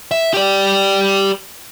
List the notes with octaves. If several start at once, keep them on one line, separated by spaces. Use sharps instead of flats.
E5
G4 D5